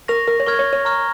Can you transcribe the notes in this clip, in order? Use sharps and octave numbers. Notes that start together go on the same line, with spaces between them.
A#4 C#6 A#6 F7
A#4
C#5
A#4 C#6 F6 G#6
C#5
C#5
A#5 C#6 F6